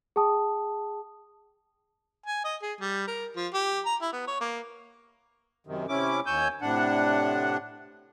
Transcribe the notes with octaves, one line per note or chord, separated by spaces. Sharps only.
G#4 G5 A5 D#6
G#5
D#5
G#4
G3
A#4
F3
G4
A#5
E4
B3
C#5
A#3
F#2 C3 D#3
C3 C#4 E4 D6
D#2 C#5 G#5 E6 G6
A2 C3 D4 F#5